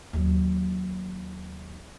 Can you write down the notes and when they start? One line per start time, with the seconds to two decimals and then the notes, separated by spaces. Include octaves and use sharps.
0.13 D#2 F#3